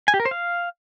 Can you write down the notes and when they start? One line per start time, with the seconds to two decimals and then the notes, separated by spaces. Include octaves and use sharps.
0.08 G#5
0.14 G4
0.20 A#4
0.25 C5
0.31 F5